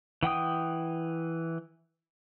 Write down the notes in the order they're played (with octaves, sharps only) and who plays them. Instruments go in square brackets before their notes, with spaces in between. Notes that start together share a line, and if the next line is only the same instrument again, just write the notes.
[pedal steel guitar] E3 F#5 G5 D#6